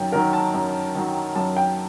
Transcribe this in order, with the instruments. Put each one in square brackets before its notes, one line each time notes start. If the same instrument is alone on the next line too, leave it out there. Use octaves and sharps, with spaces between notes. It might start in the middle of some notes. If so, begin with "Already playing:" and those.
Already playing: [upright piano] F#2 D#3 F#3 G5
D#3 F#3 A#4
A5
F#2
D#3 F#3
F#2 A5
G5